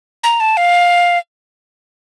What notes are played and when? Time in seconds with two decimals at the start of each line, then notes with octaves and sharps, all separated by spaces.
0.24 A#5
0.40 A5
0.57 F5